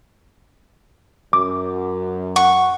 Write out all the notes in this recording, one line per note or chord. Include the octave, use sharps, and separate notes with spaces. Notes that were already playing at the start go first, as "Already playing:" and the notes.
F#2 D6
F#5 C#6